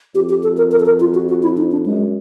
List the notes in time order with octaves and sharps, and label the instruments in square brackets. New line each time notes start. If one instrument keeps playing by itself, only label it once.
[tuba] F2 [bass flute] G4
[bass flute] G4
A4
A#4
A#4
A4
A#4
F4
F#4
F#4
E4
D#4
D4
[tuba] F#2 [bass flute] G#3